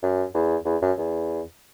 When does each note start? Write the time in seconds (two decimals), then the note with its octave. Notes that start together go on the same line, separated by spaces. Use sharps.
0.03 F#2
0.35 E2
0.66 E2
0.82 F#2
0.98 E2